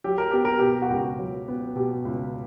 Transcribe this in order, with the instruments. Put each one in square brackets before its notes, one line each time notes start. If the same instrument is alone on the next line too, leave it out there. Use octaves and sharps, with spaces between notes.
[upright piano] F#3 [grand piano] G4
[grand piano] A#4
[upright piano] B3 [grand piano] G4
[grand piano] A#4
[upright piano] B2 [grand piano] G4
[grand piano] F#4
[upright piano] C#2 [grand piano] G4
[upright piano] F#3
B3
[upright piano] B2 [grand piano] G4
[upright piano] C#2